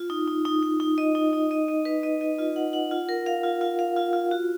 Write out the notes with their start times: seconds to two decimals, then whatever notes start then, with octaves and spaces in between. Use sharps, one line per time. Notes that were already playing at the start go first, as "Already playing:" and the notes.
Already playing: F4
0.10 D#4
0.28 D#4
0.45 D#4
0.63 D#4
0.80 D#4
0.98 D#5
1.15 D#4
1.33 D#4
1.51 D#5
1.68 D#5
1.85 B4
2.03 D#5
2.21 D#5
2.38 F4
2.56 F#5
2.73 F#5
2.91 F4
3.09 A#4
3.26 F5
3.43 F4
3.61 F4
3.79 F5
3.96 F4
4.13 F4
4.31 F#4